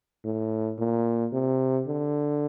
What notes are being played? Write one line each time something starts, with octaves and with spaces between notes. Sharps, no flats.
A2
A#2
C3
D3